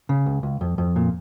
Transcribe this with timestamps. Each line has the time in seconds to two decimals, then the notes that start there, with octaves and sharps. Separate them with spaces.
0.09 C#3
0.26 C#2
0.43 C#2
0.61 F2
0.78 F2
0.96 A#2